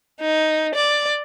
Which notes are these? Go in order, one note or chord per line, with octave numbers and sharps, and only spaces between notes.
D#4
D5